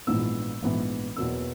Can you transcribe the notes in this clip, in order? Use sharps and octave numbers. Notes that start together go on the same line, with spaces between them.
A#1 G#2 E3 B3 E4 E6
A#1 G#2 E3 B3 E4
E2 B2 F#3 A#3 E6